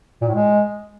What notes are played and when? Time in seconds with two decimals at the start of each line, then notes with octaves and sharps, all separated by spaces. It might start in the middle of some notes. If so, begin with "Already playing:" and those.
0.21 A#2
0.28 A2
0.35 G#3